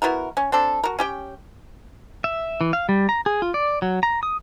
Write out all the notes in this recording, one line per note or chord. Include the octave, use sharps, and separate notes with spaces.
B3 E4 F#4 A#4
C#4
C4 D4 A4
F#4 A#4
C#4 G4 G5
E5
E3
F5
G3
A#5
G#4
F4
D5
F#3
A#5
D#6